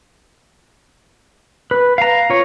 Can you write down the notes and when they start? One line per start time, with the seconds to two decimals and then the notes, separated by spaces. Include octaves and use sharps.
1.71 B4
1.98 F5 A#5
2.30 F4 C#5